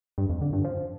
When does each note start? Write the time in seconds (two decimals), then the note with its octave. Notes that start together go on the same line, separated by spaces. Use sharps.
0.18 G2
0.29 F2
0.41 D3
0.53 G2
0.64 F3